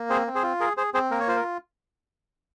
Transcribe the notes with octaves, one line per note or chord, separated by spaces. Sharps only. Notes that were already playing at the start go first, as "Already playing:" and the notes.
Already playing: A#3
C4 G#4 C5
C4
G#4 C5
F4
G#4 A#4
G#4 C5
C4 G#4 C5
A#3 A#4
C#5
F4 C5
A#4